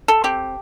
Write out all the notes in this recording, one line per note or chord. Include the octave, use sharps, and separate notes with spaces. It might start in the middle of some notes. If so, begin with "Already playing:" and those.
A4
C4 G4